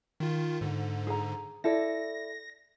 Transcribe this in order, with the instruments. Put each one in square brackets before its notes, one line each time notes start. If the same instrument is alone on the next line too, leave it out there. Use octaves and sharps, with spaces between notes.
[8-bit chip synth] D#3 F4
G#2 D3
[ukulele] G#4 A#5
[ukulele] E4 A4 D5 [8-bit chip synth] A#6